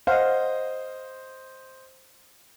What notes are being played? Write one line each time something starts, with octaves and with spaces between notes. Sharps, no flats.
C5 D#5 F5 F#5